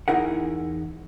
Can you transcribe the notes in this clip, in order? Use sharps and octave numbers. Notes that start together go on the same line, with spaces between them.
E2 D#4 E4 A#4 F#5